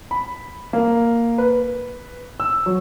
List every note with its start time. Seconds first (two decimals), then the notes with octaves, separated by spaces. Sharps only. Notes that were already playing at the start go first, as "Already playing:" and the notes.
0.11 B5
0.73 A#3
1.38 B4
2.40 E6
2.66 F#3